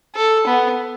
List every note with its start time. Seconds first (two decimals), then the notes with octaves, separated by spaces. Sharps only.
0.15 A4
0.46 B3